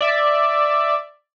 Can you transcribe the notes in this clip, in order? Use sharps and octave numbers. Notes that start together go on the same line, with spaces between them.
D5 E5